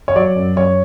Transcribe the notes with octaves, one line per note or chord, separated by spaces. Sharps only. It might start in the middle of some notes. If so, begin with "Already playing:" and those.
C#5
F#3 D5
F#2
F#2 C#5